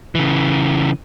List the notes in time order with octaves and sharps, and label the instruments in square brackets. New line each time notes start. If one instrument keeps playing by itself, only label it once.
[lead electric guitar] C#3 E3